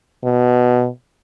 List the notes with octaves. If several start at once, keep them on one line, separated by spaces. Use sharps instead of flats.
B2